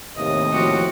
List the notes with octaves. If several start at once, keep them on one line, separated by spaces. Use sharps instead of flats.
D#2 A2 C3 D#5
F3 F#4 G4